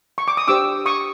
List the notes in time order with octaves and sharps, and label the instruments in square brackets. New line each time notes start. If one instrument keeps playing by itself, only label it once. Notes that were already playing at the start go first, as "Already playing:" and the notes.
[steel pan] C#6
D6
D#6
D4 G4 C5 D6 E6
C#6 D#6